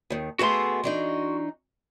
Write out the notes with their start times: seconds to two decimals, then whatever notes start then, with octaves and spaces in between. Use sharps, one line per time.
0.10 D#2 D#3
0.39 A3 B3 F#4 G#4 C6
0.84 E3 D4 D#4